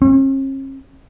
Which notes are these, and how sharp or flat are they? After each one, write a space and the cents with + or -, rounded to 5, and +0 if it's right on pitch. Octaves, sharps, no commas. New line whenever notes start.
C#4 -45